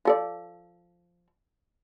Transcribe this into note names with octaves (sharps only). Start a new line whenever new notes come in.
F3 A4 D5